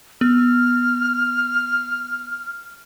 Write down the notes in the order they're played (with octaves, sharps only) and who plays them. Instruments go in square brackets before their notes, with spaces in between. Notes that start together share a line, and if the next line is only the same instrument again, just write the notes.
[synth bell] B3 [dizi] F6